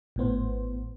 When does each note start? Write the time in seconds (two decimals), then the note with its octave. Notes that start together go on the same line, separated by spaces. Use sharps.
0.16 G#1 A2 B3 C5